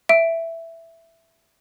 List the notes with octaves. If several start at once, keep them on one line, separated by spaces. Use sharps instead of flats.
E5 D7